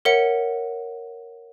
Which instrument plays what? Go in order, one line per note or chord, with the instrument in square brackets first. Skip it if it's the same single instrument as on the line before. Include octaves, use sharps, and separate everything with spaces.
[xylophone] A#4 C#5 E5 F#5 C#7